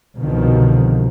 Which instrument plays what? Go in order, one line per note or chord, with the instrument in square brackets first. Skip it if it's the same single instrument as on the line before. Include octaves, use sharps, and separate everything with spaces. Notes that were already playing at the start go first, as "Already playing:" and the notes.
[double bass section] C2 B2 D3 D#3 F3